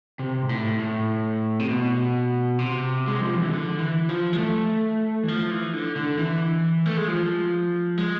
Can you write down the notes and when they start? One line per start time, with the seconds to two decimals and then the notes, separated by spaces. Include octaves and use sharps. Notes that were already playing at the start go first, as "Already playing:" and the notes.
0.19 C3
0.42 G#2
0.49 A2
0.79 A2
1.59 C3
1.69 B2
2.59 C3
3.08 G#3
3.21 F3
3.35 E3
3.49 D3
3.78 E3
4.09 F3
4.33 G#3
4.38 A3
5.23 E3
5.28 F3
5.51 E3
5.73 D3
5.96 D3
6.18 E3
6.86 A3
6.97 G#3
7.08 F3
7.98 G#3